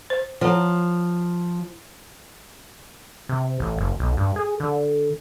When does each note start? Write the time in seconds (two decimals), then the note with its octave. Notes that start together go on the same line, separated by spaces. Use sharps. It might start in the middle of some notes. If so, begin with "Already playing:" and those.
0.10 C5
0.41 F3 C#5 F#5 A#5
3.29 C3
3.60 A1
3.78 F#1
4.00 B1
4.17 G2
4.36 G#4
4.60 D3